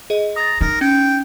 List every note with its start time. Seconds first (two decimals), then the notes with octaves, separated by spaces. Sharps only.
0.10 G#4 D#5
0.36 A#5 D#6 A6
0.61 D#4 A#4
0.81 C#4 G5